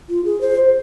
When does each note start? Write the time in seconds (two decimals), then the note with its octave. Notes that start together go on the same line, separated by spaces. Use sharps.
0.09 F4
0.25 G#4
0.41 C5